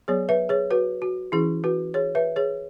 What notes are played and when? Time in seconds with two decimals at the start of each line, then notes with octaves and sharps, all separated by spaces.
0.08 F#3 B3 G#4 C#5
0.29 B4 E5
0.49 G#4 C#5
0.71 F#4 B4
1.02 F#4
1.32 E3 C#4 E4 G#4
1.64 F#4 B4
1.94 G#4 C#5
2.15 B4 E5
2.36 G#4 C#5